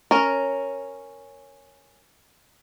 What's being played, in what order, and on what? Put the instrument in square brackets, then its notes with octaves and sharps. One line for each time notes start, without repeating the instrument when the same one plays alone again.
[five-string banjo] C#4 A#4